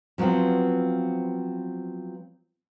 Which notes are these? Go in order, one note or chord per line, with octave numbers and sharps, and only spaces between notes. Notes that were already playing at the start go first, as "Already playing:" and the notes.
F3 F#3 B3 C4 F4